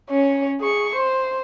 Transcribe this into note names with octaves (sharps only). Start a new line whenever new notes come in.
C#4 C#5
G#4 C#6
C5